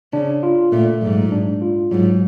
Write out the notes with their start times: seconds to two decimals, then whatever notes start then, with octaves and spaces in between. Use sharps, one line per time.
0.13 C#3 D4
0.43 F4
0.72 A#2 A3
1.02 G#2 F#3
1.32 D4
1.62 F4
1.91 G#2 F#3